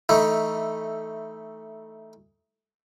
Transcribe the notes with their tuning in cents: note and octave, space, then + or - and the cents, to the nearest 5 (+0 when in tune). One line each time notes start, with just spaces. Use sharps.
E3 -5 A3 +0 D#4 +15